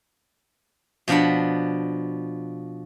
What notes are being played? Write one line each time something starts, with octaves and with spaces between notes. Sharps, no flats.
B2 F3 D4 F#5 B5